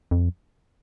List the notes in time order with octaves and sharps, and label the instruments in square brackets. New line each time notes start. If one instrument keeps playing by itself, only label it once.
[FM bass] F2